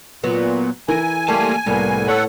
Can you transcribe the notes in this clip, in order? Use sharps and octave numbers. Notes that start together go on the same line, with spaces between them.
A#2 F#3 B3
E3 A#4 G#5
G3 A3 A#3 F5 A5
C2 A2 G3 A#3 B3
A4 B4 C#5 F#5